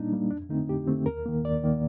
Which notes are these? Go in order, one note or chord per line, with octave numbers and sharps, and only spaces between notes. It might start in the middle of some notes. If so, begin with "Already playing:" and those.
Already playing: A#2 G3 A#3 D4 D#4
G3 A#3
F2 D4
D3 A3 C4 D#4
F2 G4
D3 A3 C4
D#2 A#4
D#3 A#3
D#2 D5
D#3 A#3